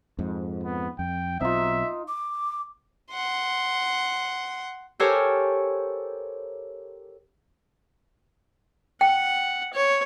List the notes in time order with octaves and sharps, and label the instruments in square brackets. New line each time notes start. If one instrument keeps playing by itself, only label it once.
[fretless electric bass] F2 G#2
[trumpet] B3
[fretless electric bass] F2 [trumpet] G5
[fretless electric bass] B1 C4 [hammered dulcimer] D#4 F4 [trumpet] E5
[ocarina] D6
[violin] F#5 C6
[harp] G4 A4 A#4 C5 C#5 G#5
[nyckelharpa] F#5 [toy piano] G5
[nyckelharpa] C#5